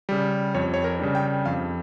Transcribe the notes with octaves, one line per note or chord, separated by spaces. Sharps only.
C#3 G3
F2 C#5
C#5
A#4
C#3 G3 D4
G5
F2 F5